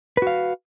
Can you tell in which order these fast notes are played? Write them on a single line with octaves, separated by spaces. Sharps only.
B4 F#4 F5